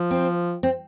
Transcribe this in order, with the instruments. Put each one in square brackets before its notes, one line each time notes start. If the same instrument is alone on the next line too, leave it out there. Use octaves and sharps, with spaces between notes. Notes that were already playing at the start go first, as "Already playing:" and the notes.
Already playing: [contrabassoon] F3
[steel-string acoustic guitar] C4
C4